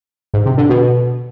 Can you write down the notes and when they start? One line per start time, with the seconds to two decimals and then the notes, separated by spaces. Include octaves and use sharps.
0.34 G#2
0.46 C3
0.57 D3
0.69 B2